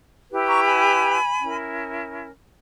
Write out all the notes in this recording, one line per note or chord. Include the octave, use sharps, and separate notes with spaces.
E4 G4 B4
A#5 C#6
G#5 B5
C#4 E4 A#4